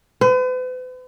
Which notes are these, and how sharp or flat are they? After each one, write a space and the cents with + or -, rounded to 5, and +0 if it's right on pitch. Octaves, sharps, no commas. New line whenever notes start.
B4 +45